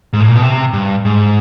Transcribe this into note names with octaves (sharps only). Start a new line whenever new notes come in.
G#2
A2
A#2
B2
C3
G2
G#2